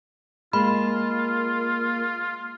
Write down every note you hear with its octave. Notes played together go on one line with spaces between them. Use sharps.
G#3 A#3 F4 B5